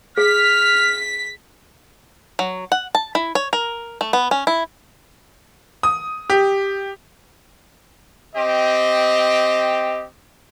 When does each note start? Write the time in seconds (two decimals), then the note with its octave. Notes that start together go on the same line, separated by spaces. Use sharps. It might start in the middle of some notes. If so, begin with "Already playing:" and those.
0.18 G#4 F6 B6
2.39 F#3
2.72 F#5
2.95 A5
3.15 E4
3.35 C#5
3.53 A#4
4.01 A3
4.13 B3
4.31 C#4
4.47 E4
5.83 D#6
6.30 G4
8.36 C4 G4 D#5